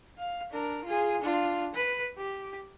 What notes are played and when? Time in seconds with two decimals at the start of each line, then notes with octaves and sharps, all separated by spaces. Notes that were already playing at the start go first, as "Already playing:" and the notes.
0.18 F5
0.51 D4 A#4
0.84 F4 G#4
1.21 D4 F4
1.74 B4
2.18 G4